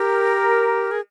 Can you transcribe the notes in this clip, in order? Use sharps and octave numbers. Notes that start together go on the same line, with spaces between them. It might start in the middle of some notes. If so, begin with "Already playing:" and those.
Already playing: G4 A#4
G#4